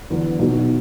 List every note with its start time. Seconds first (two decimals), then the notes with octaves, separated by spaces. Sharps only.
0.10 E2 D3 F#3
0.39 B1 B2 F#3